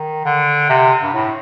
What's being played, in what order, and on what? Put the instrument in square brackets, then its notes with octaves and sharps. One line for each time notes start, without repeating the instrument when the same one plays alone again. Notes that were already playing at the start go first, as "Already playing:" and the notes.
Already playing: [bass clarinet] D#3
D3
C3
G2
A2